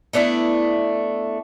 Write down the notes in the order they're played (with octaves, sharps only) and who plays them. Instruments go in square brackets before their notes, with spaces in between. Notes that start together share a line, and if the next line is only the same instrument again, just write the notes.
[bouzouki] A3 B3 D4 E4